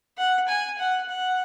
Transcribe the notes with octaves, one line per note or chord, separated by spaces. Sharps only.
F#5
G#5
F#5
F#5